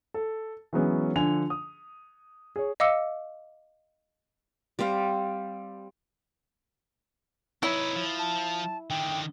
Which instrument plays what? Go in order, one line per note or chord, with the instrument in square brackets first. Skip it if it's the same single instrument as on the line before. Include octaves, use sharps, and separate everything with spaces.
[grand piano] A4
E3 F#3 G#3 B3 C#4
D3 F3 G#5 F7
D#6
G#4 C#5
[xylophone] D#5 F5 D6 E6 C#7
[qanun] G3 C4 C5 F5
[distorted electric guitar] D#4 B4 [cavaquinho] E4 [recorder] C#5
[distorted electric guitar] F3
[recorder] A5
[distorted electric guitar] D3 D#3 [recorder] G5